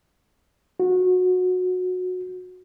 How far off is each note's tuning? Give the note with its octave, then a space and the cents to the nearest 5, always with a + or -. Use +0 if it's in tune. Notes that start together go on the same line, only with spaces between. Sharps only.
F#4 -20